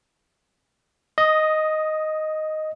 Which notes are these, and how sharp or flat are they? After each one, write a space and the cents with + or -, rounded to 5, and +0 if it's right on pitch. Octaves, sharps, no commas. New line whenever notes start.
D#5 +0 D#6 +20